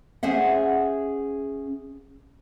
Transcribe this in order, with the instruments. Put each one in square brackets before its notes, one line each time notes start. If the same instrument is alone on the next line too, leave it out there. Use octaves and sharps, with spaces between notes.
[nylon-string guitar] C#4 G#4 C5 E5 F#5